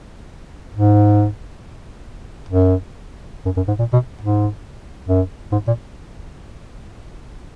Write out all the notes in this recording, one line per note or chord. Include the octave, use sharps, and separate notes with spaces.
G#2
F#2
F#2
F#2
G#2
A#2
B2
G#2
F#2
G#2
A#2